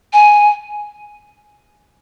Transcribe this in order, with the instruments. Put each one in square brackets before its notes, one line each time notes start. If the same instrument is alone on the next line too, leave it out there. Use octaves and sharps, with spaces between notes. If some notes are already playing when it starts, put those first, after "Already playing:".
[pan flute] G#5